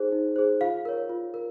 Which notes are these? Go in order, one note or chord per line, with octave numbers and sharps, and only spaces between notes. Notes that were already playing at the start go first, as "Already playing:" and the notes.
Already playing: D#4 G#4 C5
D#4
G#4 C5
F4 F5
A#4 C#5
F4
A#4